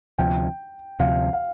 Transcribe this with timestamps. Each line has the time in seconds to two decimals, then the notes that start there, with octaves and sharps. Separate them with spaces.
0.18 D2 C3 F3 G5
1.00 D2 C3 F3 F5
1.33 F5